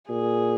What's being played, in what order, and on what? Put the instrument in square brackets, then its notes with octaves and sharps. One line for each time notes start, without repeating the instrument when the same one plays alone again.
[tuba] A#2 [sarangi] G#4